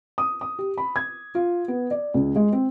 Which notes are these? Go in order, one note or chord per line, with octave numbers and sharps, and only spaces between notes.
D#6
D#6
G4
B5
G#6
F4
B3
D5
C#2
G#3
C4